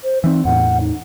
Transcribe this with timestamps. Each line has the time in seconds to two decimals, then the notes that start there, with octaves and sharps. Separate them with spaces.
0.04 C5
0.24 E3 C4 D#4
0.45 E2 A2 F#5
0.81 D#4